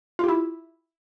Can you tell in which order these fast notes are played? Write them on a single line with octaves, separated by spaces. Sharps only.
F4 G4 E4